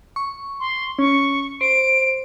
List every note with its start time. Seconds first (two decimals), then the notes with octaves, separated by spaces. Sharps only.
0.16 C#6
0.60 C6
0.99 C#4 C#6
1.61 C5 D7